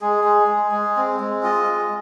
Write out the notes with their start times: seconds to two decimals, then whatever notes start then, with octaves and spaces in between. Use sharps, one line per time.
0.01 G#3 G#4
0.24 G#3
0.48 G#3
0.72 G#3
0.97 C4
1.20 G#3
1.43 F4 D#5
1.68 G#3